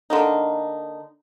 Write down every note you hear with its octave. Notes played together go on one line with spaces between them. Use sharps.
D3 A#3 D#4